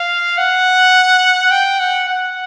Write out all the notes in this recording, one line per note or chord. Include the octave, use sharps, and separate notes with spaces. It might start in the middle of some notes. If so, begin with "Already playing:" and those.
Already playing: F5
F#5
G5
F#5
F#5